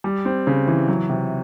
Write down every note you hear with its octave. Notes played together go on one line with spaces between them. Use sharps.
G3
C4
C#3
E3
F#3
C3